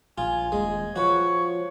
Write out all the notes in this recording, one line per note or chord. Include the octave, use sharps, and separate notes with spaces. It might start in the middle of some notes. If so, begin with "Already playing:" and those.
A#1 F4 G#5
D#1 G#3
F3 F#4 B4 C#5